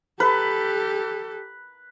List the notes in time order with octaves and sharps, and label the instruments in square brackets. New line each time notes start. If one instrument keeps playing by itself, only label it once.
[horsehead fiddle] G4 A4 [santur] B4